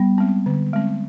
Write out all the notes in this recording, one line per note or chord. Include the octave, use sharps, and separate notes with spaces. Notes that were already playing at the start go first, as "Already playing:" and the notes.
Already playing: G3 B3
G#3 C4
D3
G#3 C4